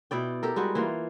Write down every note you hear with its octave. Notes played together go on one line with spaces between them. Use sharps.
B2 E4 D5 G5
G4 A4 A#4
G3 G#3 F#4
E3 A#3 F4